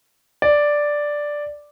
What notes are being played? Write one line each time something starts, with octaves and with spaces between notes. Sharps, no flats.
D5